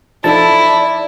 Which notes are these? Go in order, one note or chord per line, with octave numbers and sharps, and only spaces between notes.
F3 D#4 E4 A4 D5 A5